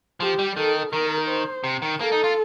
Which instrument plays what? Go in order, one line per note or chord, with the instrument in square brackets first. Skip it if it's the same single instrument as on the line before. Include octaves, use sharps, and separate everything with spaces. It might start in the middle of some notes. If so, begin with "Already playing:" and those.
[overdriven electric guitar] F3 [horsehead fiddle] G4
[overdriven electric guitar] G3
[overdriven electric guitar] D#3 [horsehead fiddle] A4
[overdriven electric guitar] D#3 [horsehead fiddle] A#4
[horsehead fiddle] C5
[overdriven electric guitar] C3
D#3
[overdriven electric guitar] A#3 [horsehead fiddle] A4
[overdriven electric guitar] D#4
F4